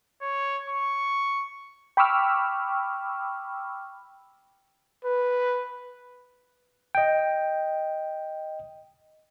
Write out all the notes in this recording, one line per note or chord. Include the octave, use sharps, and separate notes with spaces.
C#5
C#6
G5 B5 C#6 D6 E6 F6
B4
D#5 G5